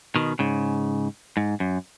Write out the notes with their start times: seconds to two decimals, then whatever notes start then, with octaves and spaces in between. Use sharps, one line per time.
0.16 B2 D#3
0.39 G#2 C#3
1.37 G#2
1.60 F#2